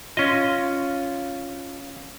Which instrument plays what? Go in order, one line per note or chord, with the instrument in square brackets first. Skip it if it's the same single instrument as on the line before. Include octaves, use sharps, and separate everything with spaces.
[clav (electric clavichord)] C#4 D#5 [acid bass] F4